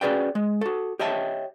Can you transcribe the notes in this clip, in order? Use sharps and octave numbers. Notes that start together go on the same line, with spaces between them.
C#4 F#4 G#4 B4 D5 G5
G#3
F#4 A4
G4 C#5 D#5 E5 G5 A5